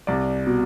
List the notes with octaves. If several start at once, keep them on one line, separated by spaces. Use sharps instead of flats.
C2 D5
B2